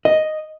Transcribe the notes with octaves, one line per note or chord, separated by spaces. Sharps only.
D#5